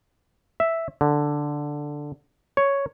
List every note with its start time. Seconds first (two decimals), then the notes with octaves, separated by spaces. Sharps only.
0.60 E5
1.01 D3
2.57 C#5